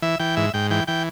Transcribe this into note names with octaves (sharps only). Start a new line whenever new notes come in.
E3 E5
E3 G5
G#2 E5
G#2 G5
E3 G5
E3 G5